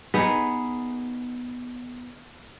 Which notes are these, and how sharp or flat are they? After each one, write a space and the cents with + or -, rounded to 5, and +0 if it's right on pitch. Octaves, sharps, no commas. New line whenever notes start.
B3 +0 D#4 +0 G#4 +0